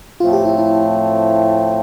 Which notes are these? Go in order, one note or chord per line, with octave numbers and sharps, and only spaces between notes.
A2 F3 A3 C4 F4
G4
E4
E4